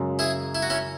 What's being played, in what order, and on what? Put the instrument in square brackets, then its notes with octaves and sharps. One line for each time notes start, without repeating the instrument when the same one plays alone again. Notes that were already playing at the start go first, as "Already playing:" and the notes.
Already playing: [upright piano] F#2 C#3 G#3
[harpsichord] E4 G#4
E4
F#4
C#4 E4